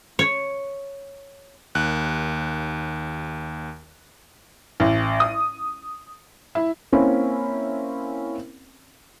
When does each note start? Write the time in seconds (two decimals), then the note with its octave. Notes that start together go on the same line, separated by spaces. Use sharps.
0.19 C#5
1.75 D#2 F#6
4.80 A1
5.20 D#6
6.55 E4
6.92 A#3 C4 C#4 E4 A#4